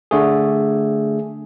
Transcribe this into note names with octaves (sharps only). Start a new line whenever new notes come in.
D3 A3 G#4